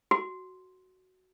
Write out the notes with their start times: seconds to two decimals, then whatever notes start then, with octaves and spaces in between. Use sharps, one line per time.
0.11 F#4